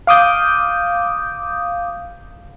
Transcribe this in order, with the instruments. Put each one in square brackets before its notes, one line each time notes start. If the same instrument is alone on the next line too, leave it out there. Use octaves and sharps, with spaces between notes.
[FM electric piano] F5 D6 D#6 G6